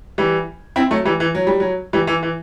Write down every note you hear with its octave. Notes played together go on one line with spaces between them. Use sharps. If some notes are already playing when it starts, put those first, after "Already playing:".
E3 G3
C4 E4
F#3 A3
E3 G3
E3
F#3
G3
F#3
E3 G3
E3
E3